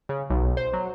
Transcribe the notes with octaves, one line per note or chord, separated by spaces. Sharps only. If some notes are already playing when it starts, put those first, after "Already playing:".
C#3
B1
C5
F#3